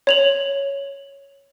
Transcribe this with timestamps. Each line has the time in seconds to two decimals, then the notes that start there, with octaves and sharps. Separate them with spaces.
0.07 C#5 F7 F#7